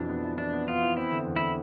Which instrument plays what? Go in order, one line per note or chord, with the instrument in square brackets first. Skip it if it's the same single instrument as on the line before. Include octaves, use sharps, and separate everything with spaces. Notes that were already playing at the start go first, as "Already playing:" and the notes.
Already playing: [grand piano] F2 B2 E3 [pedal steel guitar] D4
[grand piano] B3
E3
[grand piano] E3 [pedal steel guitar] D4
[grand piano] B3
[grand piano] B3 [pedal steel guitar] F4
[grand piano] E3
[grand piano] C4 [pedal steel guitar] E4
[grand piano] D3
E2
[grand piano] D3 [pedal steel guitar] E4